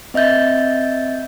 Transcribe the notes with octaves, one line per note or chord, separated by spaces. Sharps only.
C4 D#5 E5 G6 A6